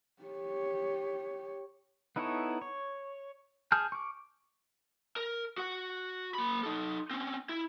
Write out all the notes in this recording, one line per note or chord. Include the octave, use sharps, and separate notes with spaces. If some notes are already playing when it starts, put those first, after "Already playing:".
G4 C#5
B3 D#4 E4 A4 C#5
C#5
G#4 A5 F6 G6
C#6 D6
A#4
F#4 F#5
A#3 B5
D#4 A4
C4 C#4
E4